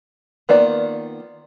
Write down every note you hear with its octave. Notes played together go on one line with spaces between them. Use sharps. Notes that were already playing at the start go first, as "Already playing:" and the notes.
D#3 A#3 B3 F4 D5